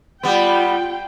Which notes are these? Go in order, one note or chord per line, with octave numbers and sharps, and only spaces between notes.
G3 B3 F4 G5